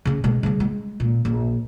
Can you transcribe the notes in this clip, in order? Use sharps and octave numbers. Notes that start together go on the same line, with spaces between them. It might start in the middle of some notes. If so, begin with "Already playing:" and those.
C#3 C#4
B2 G#3
C#3 G3
G#3
A#2
A#1